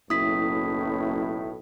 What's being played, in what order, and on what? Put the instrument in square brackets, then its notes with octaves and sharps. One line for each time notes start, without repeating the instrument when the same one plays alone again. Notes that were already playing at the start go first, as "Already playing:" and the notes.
[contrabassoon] F#1 [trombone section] B1 A2 [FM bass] E4 [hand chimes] D#6 B6